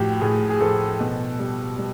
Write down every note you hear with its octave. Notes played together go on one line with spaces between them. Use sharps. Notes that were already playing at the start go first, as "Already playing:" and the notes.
Already playing: A2 F3 F#4 G4
A2 G#4
G#4
F3 A4
B2
G3
G3